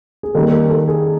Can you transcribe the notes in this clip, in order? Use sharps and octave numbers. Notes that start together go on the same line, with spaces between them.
G#4
D#3 G3 A#3 A4
A#4
A4
G#4